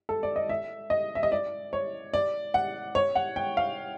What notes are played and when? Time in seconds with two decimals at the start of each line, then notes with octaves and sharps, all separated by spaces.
0.09 A4
0.23 D5
0.36 D#5
0.49 E5
0.90 D#5
1.15 E5
1.23 D#5
1.32 D5
1.73 C#5
2.14 D5
2.54 F#5
2.95 C#5
3.15 F#5
3.36 G5
3.57 F5